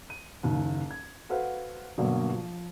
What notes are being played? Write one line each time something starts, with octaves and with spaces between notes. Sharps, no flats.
D#7
F#1 D#2
G#6
F#4 A4 B4 C5 F5 F#5
G2 B2 D3 F#3 A#3
F3